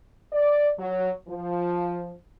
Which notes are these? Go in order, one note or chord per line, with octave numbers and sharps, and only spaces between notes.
D5
F#3
F3